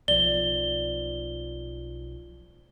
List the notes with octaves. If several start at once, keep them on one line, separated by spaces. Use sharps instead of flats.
B1 F3 D5 G7